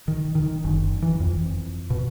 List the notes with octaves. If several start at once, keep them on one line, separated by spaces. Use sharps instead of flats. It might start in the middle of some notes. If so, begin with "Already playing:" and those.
D#3
D#3
F#1
E3
F2
B2